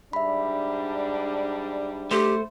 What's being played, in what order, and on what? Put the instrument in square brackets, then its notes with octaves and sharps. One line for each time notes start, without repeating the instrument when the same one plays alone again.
[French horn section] G#2 G3 D4 [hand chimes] E5 B5
[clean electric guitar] A3 C5 [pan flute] G4